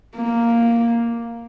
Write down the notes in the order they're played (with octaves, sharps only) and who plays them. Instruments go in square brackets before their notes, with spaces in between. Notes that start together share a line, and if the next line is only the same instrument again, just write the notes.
[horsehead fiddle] A#3